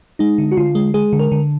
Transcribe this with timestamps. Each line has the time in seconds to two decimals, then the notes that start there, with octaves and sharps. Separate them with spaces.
0.19 G#3 D#4
0.38 D3
0.51 F#4
0.57 D3 F4
0.75 G#3
0.94 G#3 G#4
1.13 D3
1.19 A#4
1.32 D3